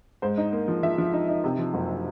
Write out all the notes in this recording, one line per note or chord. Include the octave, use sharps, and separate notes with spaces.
G#2 C5
D#4
A#3
F3
F3 E5
F3
D#4
D#4
C3
F3
F#1